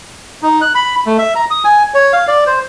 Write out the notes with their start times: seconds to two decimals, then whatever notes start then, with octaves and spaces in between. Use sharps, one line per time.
0.43 D#4
0.61 F#6
0.75 B5
1.06 A3
1.18 E5
1.36 A#5
1.50 D#6
1.64 G#5
1.94 C#5
2.13 F5
2.28 D5
2.47 C5